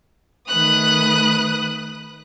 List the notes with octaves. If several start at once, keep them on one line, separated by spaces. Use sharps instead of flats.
D#3 A3 B4 D#6 F#6